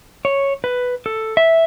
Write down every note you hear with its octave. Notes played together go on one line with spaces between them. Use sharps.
C#5
B4
A4
E5